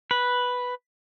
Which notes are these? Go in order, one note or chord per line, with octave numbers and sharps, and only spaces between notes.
B4